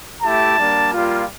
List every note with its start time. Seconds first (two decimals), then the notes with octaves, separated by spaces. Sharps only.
0.23 A3 E4 G4 A5
0.58 G3 A#3 D4
0.92 G3 A#3 F4